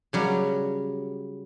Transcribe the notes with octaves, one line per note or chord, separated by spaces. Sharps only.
C#3 F#3 G3